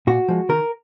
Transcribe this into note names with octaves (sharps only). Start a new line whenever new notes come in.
A#2 F#4
F3 G#3
D#3 A#4